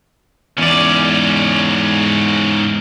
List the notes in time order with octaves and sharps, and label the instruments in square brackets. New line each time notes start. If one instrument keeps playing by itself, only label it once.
[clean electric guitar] E2 D5 [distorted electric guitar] G#2 C#4